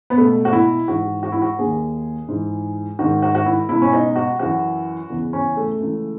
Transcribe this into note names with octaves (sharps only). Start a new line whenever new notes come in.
B3
C#2 B2 A3
F#4
E4
G#2 E3 F#4
F#4
E4
F#4
D#2 D#3 G#4
G#2 E3
G#2 D#3 F#4
F#4
F#4
E4
C#2 B2 E4
C#4
D#4
F#4
F#2 E3 F#4
E2 C#3 E3
C#4
A3
C#2 C#3 E3